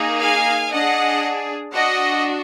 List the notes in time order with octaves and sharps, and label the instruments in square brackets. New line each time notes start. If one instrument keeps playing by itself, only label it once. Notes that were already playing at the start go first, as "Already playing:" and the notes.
Already playing: [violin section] A#3 D#4 G#4
F5 G#5
D4 G#4 D#5 F#5
D4 F#4 D#5 F#5